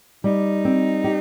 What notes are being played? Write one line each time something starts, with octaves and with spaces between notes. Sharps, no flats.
G3 D#4
C4
G4